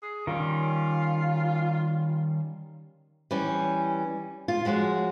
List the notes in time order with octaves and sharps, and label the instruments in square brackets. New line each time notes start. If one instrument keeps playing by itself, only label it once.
[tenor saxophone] G#4
[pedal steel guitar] D#3 G3 C#4 [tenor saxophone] F4
[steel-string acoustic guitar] E3 G3 C#4
F4
F3 G#3 F#4 C#5